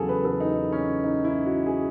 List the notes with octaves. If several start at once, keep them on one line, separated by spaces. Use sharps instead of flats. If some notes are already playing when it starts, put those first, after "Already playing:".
Already playing: E2 C#3 F#3 G#4 A4
B4
A4
D#4
C#4
D#4
E4
F#4
G#4